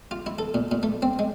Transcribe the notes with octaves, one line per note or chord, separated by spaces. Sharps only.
F4
E4
A4
A#2
A#2
A3
C4
G#3